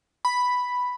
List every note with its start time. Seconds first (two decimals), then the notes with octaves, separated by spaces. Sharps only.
0.25 B5